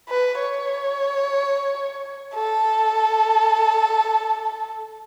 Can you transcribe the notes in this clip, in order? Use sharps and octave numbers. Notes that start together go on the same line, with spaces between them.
B4
C#5
A4